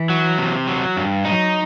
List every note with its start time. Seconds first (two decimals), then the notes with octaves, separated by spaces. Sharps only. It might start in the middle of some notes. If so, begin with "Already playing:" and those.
Already playing: E3
0.09 F#3
0.38 C3
0.68 F#3
0.97 G2
1.25 F#3 D#4